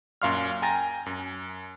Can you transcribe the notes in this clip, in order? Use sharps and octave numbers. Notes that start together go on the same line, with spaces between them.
F#2 A#2 F5 C6 C#6 F6
G5 G#5 A#5 A6 A#6
F#2